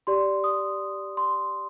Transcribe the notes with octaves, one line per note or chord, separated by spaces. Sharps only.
G4 D5 C6
D#6
C6